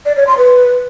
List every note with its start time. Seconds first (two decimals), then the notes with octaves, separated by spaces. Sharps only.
0.06 D5
0.16 C#5
0.27 C6
0.38 B4